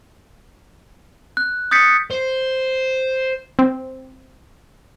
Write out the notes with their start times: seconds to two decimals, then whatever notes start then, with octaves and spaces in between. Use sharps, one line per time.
1.37 F#6
1.71 D#6 G6 A6 B6 C#7
2.10 C5
3.59 C4